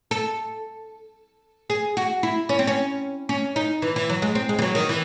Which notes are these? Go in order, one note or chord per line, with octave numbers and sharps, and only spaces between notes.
A4
G#4
F#4
E4
C#4
C4
C#4
C#4
D#4
E3
E3
F#3
G#3
C4
G#3
E3
F#3
D#3
E3